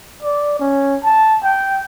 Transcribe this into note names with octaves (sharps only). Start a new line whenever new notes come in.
D5
C#4
A5
G5